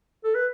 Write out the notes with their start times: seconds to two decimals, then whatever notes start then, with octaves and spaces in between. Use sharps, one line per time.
0.24 A4
0.35 B4